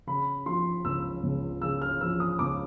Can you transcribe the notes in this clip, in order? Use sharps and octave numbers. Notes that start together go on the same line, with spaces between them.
C#3 B5
F3 C6
C#2 E6
C#2
C#3 E6
F6
F3 E6
D#6
C#2 D6